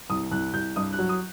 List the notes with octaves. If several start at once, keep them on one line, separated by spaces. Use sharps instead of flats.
C2 D#6
C2 F#6
C2 G6
G2 D#6
F#6
F#3
D#6